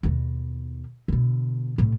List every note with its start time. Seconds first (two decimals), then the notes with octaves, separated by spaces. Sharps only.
0.03 D#2 B2
1.08 B2 D3
1.78 A2 C3